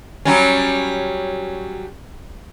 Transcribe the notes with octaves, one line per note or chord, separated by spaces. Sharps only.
F#3 G3 C#4